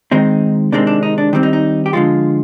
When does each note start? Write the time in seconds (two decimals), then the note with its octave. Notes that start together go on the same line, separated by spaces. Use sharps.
0.11 D#3 G#3 C4 D#4
0.72 C3 D#3 G#3 C4 D4
0.87 D4
1.03 D#4
1.18 D4
1.33 D#3 G3 C4
1.43 D#4
1.53 D#4
1.86 G4
1.93 D3 F3 G#3 F4